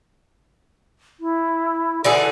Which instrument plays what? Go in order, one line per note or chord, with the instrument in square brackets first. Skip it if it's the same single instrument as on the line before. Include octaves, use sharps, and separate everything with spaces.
[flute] E4
[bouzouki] D3 E3 G#4 [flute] A4